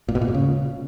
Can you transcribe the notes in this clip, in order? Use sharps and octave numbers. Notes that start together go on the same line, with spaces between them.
A#2
B2
A#2
G#2
C#3